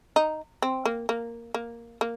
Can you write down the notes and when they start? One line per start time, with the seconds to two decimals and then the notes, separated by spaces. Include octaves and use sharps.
0.16 D#4
0.62 C4
0.85 A#3
1.09 A#3
1.54 A#3
2.01 A#3